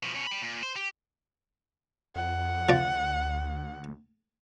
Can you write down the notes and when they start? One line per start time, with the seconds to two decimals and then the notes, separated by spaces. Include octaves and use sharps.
0.03 B2 F3
0.16 B2 C#4
0.27 G5 B5
0.42 A#2
0.63 C5
0.76 G4
2.16 F2 F#5
2.69 D2 F3 D5